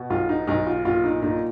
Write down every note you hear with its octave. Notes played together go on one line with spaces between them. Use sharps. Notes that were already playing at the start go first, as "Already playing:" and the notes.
Already playing: B2
B1 F4
D#4
B1 D#4
F4
A#2 F4
D#4
A#2 D#4